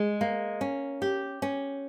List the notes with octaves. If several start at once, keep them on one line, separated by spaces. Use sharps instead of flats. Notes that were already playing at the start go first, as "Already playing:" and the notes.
Already playing: G#3
A#3
C#4
G4
C#4